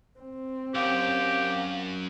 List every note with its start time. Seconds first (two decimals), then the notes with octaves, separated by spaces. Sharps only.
0.19 C4
0.75 B1 F#2 G4 F5